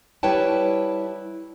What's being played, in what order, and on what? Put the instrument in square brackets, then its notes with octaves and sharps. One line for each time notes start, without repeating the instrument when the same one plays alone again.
[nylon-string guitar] G3 E4 B4 C#5 G5 A5